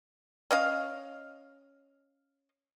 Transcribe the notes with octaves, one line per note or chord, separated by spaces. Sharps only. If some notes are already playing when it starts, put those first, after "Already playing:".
C#4 D#5 F5